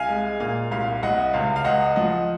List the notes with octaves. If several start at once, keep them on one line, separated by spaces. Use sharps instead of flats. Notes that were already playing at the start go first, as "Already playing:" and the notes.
Already playing: C2 F5 G#5
G#3
A#2 F5
C2 F5
C2 D#5 F#5
C#2 F5
F5
C#2 D#5 F#5
F3 D#5 F#5